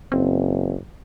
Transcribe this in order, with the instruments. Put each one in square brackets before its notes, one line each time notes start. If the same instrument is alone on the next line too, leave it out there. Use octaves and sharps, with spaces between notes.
[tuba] F#1 [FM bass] C4